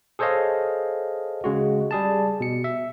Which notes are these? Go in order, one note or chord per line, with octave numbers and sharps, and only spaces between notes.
G#4 A4 C5 C#5 D#5 F5
C#3 G#3 F#4
G3 G#4 A5
B2 C#7
E5